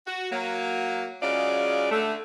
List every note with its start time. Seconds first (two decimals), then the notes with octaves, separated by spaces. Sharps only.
0.07 F#4
0.31 F#3 A#3
1.21 C#3 F#3 G#3 F4 D5
1.91 D3 A3